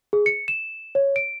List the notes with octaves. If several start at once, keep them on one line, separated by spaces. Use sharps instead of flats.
G#4
C#7
E7
C#5
D7